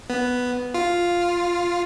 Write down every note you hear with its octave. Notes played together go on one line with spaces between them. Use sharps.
B3
F4